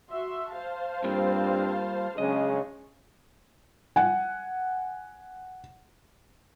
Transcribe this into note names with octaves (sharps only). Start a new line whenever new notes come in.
F#4 E5 C6
C5 F5 A5
G2 G3 A#3 C4 F4
C#3 F#3 G#3 C#4 D4 D#5
F#5 G#5